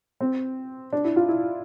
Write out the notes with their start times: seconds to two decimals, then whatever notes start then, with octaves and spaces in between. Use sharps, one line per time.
0.20 C4
0.93 D4
1.04 E4
1.16 F4
1.29 E4